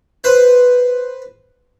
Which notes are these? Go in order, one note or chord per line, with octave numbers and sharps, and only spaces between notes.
B4 C5